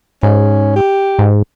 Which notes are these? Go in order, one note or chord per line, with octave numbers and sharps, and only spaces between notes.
G#2 C#4
G4
G#2